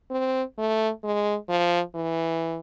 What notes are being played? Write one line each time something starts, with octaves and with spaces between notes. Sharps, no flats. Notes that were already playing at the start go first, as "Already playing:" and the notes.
C4
A3
G#3
F3
E3